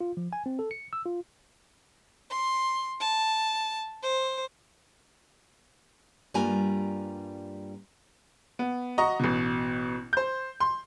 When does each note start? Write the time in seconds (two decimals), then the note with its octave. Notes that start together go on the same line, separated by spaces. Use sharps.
0.01 F4
0.17 F3
0.33 G#5
0.46 C4
0.59 A4
0.71 C#7
0.93 E6
1.06 F4
2.31 C6
3.01 A5
4.03 C5
6.34 G2 G3 A#3 F4 G#5 A#5
8.59 B3
8.98 F#4 D#5 A#5 C#6
9.20 A1 B2
10.13 C5 G6
10.60 C6